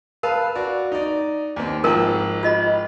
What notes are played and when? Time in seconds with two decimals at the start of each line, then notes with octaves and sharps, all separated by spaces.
0.23 A#4 B4 F5 A5
0.56 F#4 D5
0.92 D#4 D5
1.56 D#2 C4
1.84 G#1 F3 A#4 G5 A#5
2.43 F4 D#5 B5